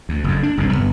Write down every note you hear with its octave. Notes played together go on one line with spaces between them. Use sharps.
D2
F#1 F2
D4
G1 C2 G#2 C#3
G1 F#2 B3